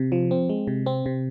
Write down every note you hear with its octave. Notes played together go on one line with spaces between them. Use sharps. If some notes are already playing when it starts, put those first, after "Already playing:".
Already playing: C3
F3
C4
G#3
C3
C4
C3